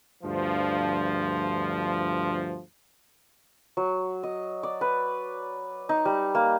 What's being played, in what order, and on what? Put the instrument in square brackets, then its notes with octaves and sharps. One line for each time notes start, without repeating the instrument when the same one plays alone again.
[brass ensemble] D2 G2 F3
[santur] F#3
D#5
D5
B4
D#4
G3
A#3